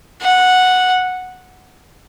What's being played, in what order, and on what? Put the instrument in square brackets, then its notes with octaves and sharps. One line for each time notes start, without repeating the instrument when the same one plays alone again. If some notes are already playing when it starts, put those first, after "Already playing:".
[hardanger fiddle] F#5